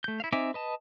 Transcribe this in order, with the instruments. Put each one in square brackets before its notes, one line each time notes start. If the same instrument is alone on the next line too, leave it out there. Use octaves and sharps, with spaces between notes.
[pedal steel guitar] A3 G6
E4 F5
C4 D#4 E5 G#5 D6
B4 D#5 A5